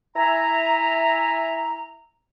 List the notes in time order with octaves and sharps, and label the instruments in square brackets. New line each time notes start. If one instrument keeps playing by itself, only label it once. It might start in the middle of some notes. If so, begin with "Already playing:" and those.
[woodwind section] E4 E5 G#5 A#5